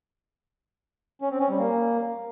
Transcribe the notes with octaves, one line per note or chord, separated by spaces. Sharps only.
C#4
C4
C#4
G3
A#3